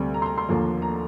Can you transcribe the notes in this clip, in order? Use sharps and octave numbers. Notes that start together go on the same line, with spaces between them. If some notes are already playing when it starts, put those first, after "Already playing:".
Already playing: D2 C3 G3 C4
A#5
C6
A#5
C6
D#2 D3 F3 A#3
A#5